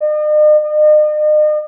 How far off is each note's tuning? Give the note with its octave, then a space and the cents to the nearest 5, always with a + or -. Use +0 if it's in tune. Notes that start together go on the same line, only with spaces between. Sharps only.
D#5 -45
D#5 -40